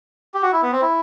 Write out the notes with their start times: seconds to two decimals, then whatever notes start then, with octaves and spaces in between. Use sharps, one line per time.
0.34 G4
0.43 F#4
0.53 E4
0.62 B3
0.72 C4
0.82 E4